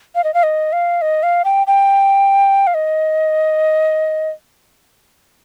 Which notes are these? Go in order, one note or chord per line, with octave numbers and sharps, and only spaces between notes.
F5
D#5
F5
D#5
F5
D#5
F5
G5
G5
F5
D#5